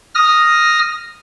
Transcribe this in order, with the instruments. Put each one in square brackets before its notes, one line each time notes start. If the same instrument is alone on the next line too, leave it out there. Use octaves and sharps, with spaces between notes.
[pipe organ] D#6 F6 A#6